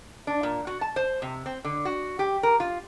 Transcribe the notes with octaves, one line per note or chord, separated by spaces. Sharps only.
D4
A#2
F#4
A5
C5
C3
C4
D3
F#4
G4
A#4
F4